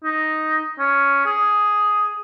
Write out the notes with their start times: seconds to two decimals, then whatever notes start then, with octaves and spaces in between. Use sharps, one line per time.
0.04 D#4
0.79 C#4
1.26 G#4